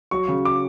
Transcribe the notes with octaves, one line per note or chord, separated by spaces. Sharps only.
F#3 C#6
C#3
D6